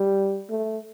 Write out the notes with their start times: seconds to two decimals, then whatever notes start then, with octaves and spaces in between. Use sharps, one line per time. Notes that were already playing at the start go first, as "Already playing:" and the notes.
Already playing: G3
0.50 A3